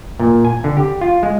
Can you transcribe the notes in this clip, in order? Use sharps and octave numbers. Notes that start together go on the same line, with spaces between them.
A#2
G#5
D3
G4
F4
G#3